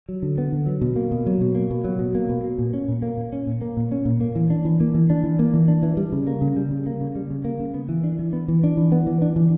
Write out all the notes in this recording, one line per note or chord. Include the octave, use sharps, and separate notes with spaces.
F#3
D3
B3
D3
F#3
B2
A#3
B2
F#3
B2
A#3
B2
F#3
B2
A#3
B2
A#3
A#2
C#4
A#2
A#3
A#2
C#4
A#2
A#3
A#2
C#4
A#2
A#3
E3
D4
E3
A#3
E3
D4
E3
A#3
E3
D4
E3
G3
C#3
A#3
C#3
G3
C#3
A#3
C#3
G3
C#3
A#3
C#3
B3
E3
D4
E3
B3
E3
D4
E3
B3
E3
D4
E3